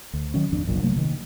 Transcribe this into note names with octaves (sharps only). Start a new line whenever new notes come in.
D2
D#3 F#3 C#4
G#1 F2 D4
F#1 B1 A#2
C3 F#3 A3 A#3
C3 D#3